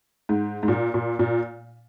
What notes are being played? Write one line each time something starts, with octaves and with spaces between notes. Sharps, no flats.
G#2
G#2
A#2
A#2
A#2